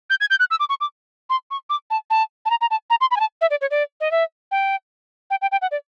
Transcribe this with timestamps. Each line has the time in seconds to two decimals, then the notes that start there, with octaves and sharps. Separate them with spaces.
0.10 G6
0.21 G#6
0.30 G6
0.40 F#6
0.51 E6
0.60 D6
0.69 C#6
0.81 D6
1.30 C6
1.51 C#6
1.70 D6
1.90 A5
2.10 A5
2.46 A5
2.50 A#5
2.61 A#5
2.71 A5
2.90 A#5
3.01 C6
3.11 B5
3.17 G#5
3.20 A5
3.41 E5
3.50 D5
3.61 C#5
3.71 D5
4.01 D#5
4.11 E5
4.52 G5
5.30 G5
5.42 G5
5.52 G5
5.62 F#5
5.71 D5